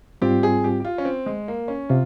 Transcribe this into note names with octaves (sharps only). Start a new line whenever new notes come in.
G#2 G3 C4 F4 G4
G#4
G4
G4
F4
C#4
C4
G#3
A#3
C#4
C3 F4